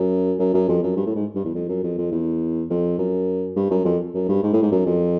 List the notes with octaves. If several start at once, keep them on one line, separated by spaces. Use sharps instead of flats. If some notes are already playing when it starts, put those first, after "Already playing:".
Already playing: F#2
F#2
F#2
F2
F#2
G2
A2
G#2
G2
E2
F2
F#2
F2
F2
E2
F2
F#2
G2
F#2
F2
F#2
G2
G#2
A2
G#2
F#2
F2